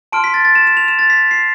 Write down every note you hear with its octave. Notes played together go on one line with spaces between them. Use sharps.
A5 C6 F6 D7
B6
A6
A6
E7
E7
F7
E7
A6
B6
C7